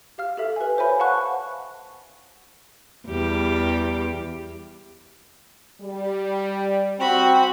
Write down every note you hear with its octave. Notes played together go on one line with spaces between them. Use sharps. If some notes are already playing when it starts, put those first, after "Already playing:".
G4 F5 F6
G4 A4 E5 F5
B4 G#5
C5 C#5 E5 G#5 B5
F5 F#5 A5 B5 C#6 F#6
E2 G3 G4
G3
C4 F#4 G5 B5